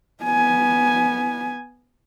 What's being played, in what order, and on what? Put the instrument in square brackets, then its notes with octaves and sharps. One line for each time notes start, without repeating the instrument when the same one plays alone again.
[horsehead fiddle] B3 G#5